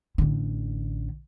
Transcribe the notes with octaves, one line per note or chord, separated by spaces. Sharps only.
A1 D3